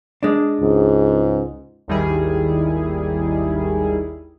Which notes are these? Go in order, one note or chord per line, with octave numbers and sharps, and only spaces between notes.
G#3 D4
C#2 G#2
G#1 D#2 D#3 G3 E4 G#4